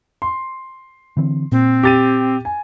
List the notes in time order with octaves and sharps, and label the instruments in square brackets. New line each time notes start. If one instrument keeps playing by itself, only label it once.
[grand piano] C6
[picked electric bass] D3 E3 C4
[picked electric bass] A#2 [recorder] C4
[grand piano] G4 A6 D#7
G#5